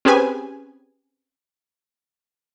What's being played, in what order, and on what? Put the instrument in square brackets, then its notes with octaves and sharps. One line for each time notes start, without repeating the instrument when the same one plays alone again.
[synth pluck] C4 C#4 G4 G#4 B4 G#5